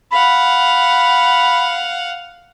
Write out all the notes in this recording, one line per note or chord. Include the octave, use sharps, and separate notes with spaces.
F5 F#5 B5